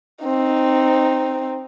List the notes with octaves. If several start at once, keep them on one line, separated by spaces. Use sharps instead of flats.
C4 D#4